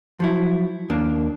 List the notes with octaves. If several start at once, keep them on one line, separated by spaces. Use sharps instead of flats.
F3 F#3 E4
D#2 A#3 D4